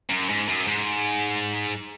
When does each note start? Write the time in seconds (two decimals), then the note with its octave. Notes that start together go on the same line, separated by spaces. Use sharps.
0.10 F#2
0.29 G#2
0.48 F#2
0.67 G#2